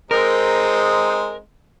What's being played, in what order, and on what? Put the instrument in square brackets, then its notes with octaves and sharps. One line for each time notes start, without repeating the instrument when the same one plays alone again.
[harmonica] G#3 C4 D#4 [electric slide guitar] A#4